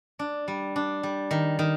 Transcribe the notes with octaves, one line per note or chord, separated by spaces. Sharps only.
D4
G3
D4
G3
D#3
D#3